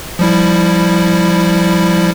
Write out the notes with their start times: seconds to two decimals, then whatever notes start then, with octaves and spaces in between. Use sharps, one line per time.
0.19 F3 G3 E4